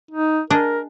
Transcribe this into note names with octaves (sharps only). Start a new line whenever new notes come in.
D#4
D4 G#4 A#4 D#5